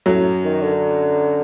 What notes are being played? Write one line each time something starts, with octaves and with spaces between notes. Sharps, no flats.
F#2 A2 F#3
D#3
D3